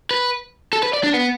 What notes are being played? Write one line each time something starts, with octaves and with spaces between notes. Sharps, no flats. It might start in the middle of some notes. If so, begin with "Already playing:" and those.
B4
A4
B4
D5
D4
B3